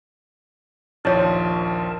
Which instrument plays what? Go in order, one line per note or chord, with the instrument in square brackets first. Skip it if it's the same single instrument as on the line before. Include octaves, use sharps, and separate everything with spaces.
[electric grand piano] A#1 D#2 F3 [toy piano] E4 C#5 [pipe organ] A#4 A5